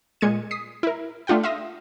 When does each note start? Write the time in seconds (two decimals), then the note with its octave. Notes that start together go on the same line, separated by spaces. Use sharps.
0.21 A#2 G#3 G#6 C#7 D#7
0.51 D#6 B6 C7
0.83 E4 A#4
1.27 A3 D4 F4 F#5 G5
1.43 E5 F5 C6 D#6 A#6